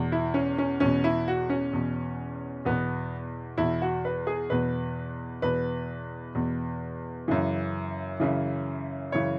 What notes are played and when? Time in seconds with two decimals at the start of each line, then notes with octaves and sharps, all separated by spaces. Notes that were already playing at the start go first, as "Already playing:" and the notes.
Already playing: E2 B2
0.12 E4
0.34 C#4
0.58 C#4
0.80 E2 B2 C#4
1.04 E4
1.28 F#4
1.50 C#4
1.73 E2 B2
2.65 E2 B2 B3
3.57 E2 B2 E4
3.82 F#4
4.05 B4
4.27 G#4
4.50 E2 B2 B4
5.42 E2 B2 B4
6.35 E2 B2
7.28 F#2 C#3 E3
8.20 F#2 C#3 E3
9.12 F#2 C#3 E3 C#5